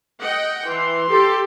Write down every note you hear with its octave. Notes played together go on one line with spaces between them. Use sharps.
D#5 F#5 G5
E3 C6
G4 A4